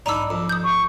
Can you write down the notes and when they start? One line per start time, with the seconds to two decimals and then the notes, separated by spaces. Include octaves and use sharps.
0.06 B1 G#2 D4 D#4 A#5 B5 D6 E6
0.30 F2
0.49 D#6 G6
0.64 A1 C#6